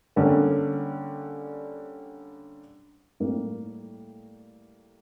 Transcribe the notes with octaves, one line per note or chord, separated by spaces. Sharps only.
D3 G3 A#3 C#4
A2 G3 A#3